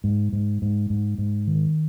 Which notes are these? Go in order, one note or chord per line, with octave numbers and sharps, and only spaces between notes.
G#2
G#2
G#2
G#2
G#2
D#3